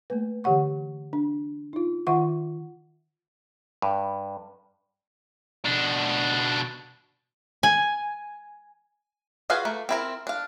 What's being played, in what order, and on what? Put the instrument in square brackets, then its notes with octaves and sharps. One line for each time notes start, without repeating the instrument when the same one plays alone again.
[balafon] A3 A#3 B4
D3 E3 G4 C#5 F#5 C#6
D4
D#4 F4
D#3 F4 E5 F#5 C#6
[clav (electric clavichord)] G2
[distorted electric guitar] B2 D4
[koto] G#5
[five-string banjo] F4 F#4 G#4 B4 F5
A3 A#3
C4 E4 A#4
D4 F5